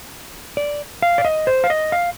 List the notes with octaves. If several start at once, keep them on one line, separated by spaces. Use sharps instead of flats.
D5
F5
D5
D#5
C5
F5
D#5
F5